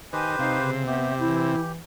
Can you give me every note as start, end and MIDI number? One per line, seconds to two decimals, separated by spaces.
0.13 0.36 51
0.13 0.70 67
0.13 0.70 71
0.13 0.70 72
0.13 0.31 80
0.39 1.56 48
0.39 0.57 63
0.39 0.83 77
0.61 0.85 49
0.87 1.11 59
0.87 1.72 67
0.87 1.14 76
1.19 1.81 52
1.19 1.60 64